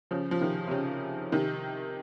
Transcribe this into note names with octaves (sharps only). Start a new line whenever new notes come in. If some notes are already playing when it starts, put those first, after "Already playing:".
C#3 F3
F3
C3 D#3
C3
C#3
C3 D#3